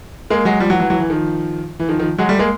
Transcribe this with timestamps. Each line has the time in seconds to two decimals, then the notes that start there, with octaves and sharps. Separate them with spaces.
0.30 G#3 A#3
0.45 F#3 G#3
0.60 F3 G3
0.70 E3 F#3
0.80 E3 F#3
0.90 E3 F#3
1.00 E3
1.10 D#3 F3
1.79 E3
1.89 D#3 F3
1.99 D#3 F3
2.18 F#3 G#3
2.29 G3 A3
2.39 G#3 A#3